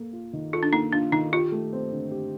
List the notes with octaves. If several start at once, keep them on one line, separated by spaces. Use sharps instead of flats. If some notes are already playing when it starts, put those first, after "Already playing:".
Already playing: A#3 A4
F4
D#3
F4 A4
D4
A#3 D#4
D4 F4
D#3 D#4
F4 G4
A3
C4
D3
G4